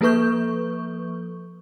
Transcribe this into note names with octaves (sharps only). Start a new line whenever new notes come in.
F3 A#3 A4 B4 C#6 G6